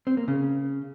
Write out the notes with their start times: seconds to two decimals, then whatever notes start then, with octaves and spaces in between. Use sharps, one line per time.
0.07 C4
0.17 A#3
0.28 C#3